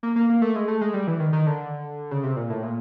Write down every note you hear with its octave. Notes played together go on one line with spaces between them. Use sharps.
A#3
A#3
A#3
A3
G#3
A3
G#3
G3
E3
D#3
D#3
D3
C#3
C3
A#2
A2
A#2